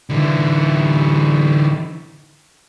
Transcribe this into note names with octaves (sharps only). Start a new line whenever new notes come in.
D3 E3